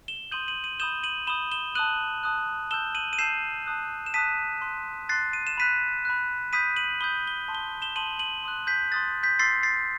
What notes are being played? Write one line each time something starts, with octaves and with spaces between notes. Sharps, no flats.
E7 G7
C6 D#6 G6 D#7 F#7
D#7 F#7
D#7 F#7
B5 D#6 G6 E7 G7
D#7 F#7
B5 D#6 G6 E7 G7
E7 G7
A5 D#6 F#6 D#7 F#7
A5 D#6 F#6
A5 E6 G6 E7 G7
D#7 F#7
D#7
A5 E6 G6 C7 E7
A5 D#6 F#6
E7
A5 D#6 F#6 B6 D#7
C6 F#6
C6 F#6 A6 C7
D#7
E7
B5 F#6 B6 D#7
B5 F#6
B5 D#6 G6 B6 D#7
D#7 F#7
B5 D#6 G6 G7
G7
A5 C6 D#6
G7
E7 G7
A5 C6 D#6 D#7 F#7
D#7 F#7
C6 D#6 F#6
G6 B6
C6 D#6 F#6 A6
G6 B6
C6 E6 G6 A6 C7
A6 C7